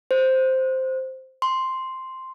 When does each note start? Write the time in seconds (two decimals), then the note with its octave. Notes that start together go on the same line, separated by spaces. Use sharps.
0.11 C5
1.42 C6